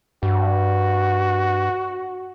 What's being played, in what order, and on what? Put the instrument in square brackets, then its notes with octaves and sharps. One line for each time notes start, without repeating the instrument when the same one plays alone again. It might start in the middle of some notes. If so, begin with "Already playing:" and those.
[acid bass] G2 [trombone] F#4